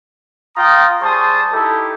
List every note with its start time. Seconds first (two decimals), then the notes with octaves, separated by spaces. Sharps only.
0.57 F4 G5 A#5 D#6
1.02 G3 G#4 C5 A5 C#6 D#6
1.53 D#4 E4 G4 A4